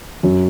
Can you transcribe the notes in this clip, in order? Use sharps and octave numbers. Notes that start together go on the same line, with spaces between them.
F#2